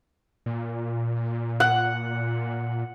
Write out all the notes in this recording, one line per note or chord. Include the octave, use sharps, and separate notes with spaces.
A#2
F#5